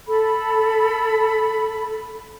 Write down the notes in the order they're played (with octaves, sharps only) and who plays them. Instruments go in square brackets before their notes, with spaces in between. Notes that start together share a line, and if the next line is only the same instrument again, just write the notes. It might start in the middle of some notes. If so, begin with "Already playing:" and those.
[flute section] A4 B5